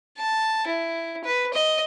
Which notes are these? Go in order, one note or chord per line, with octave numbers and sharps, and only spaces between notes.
A5
E4
B4
D#5